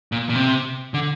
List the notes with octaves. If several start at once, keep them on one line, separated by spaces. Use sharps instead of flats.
A#2
A#2
C3
D3